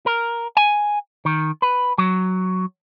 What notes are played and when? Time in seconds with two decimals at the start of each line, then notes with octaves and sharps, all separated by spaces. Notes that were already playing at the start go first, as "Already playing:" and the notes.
0.06 A#4
0.57 G#5
1.25 D#3
1.62 B4
1.98 F#3